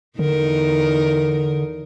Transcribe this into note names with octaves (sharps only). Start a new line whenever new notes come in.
E2 D3 D#4 A#4